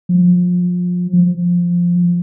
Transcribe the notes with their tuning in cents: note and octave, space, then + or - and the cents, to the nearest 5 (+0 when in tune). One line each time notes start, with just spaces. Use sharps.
F3 +30
F3 +0